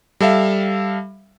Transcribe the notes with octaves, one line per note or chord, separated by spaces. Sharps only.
G3 A4 E5 F5